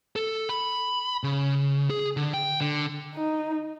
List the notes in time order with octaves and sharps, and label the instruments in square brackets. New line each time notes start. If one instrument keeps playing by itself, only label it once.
[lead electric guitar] A4
B5
C#3
G#4
D3
G5
D3
[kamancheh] D#4